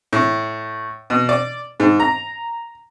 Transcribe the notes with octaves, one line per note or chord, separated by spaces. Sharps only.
A2
B2
D5
G#2
A#5